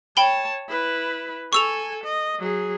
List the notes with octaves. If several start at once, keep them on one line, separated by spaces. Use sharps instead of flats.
C#5 G5 A5 B5 G7
E4 B4
A4 G#5 C#6 E6 F7
D#5
F#3 G#4